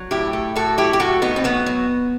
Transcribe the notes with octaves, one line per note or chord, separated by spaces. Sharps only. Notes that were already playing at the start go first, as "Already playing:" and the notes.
Already playing: F#3
A2 E4 G4
A3
A2 F#4 A4
F#3 E4 G4
G4
A2 F#4 A4
A2 B3 D#4
C4
F#3 B3
F#3